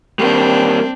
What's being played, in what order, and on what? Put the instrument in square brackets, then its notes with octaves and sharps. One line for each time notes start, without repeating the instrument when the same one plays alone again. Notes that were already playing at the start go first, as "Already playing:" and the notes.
[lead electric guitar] G3 A#3 [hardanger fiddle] C4 D4